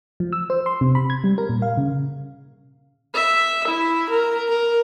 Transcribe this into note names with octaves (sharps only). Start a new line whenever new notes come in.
F3
E6
C5
C6
C3
B5
G#6
G3
A#4
A#2
F5
C#3
E5
E4
A#4
A#4